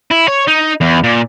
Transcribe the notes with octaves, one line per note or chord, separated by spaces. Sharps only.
E4
C#5
D#4
E2
A#2